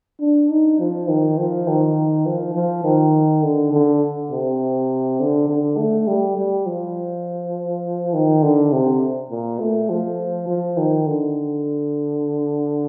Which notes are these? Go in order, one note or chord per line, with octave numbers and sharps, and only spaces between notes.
D4
D#4
F3
D#3
F3
D#3
F3
F3
D#3
D3
D3
C3
D3
D3
A3
G3
G3
F3
D#3
D3
C3
A#2
A3
F3
F3
D#3
D3